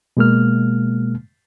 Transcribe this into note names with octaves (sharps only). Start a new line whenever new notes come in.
B2 G#3 A#3 F6